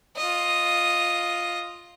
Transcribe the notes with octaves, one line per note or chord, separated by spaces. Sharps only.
F4 D#5